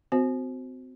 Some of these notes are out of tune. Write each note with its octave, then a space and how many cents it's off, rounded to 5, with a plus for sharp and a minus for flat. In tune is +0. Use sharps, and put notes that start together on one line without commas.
C4 -35 F#4 +0 C5 +20